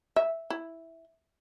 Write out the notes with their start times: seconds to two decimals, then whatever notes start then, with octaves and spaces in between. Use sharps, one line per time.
0.16 E5
0.50 E4